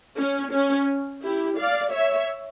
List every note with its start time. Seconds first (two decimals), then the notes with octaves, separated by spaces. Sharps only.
0.18 C#4
0.52 C#4
1.23 E4 G4
1.58 D5 F5
1.92 C#5 E5